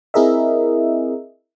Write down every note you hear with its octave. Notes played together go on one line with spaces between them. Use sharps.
C4 E4 G#4 A#4 D#5 E5